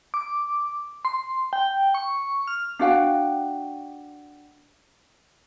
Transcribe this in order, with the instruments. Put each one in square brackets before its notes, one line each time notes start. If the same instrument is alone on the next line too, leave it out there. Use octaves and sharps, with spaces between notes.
[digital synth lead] D6
C6
G5
C#6
F6
[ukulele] D4 F#4 F5 G5